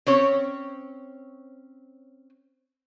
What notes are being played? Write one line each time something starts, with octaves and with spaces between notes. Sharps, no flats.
C4 C#4 C#5